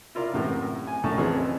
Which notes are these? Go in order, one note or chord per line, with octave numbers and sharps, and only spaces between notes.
E4 F4 A#4 D5
F#2 A2 C3 E3
G#5
A#1 F#2 A2 A3 A5 C#6
F2 E3 C4 C#4 G#4